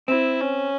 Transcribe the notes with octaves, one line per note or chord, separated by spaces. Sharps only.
C4 E4
C#4